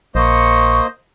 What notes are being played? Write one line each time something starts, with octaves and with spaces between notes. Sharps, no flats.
A#1 A#3 C5 D#5 C#6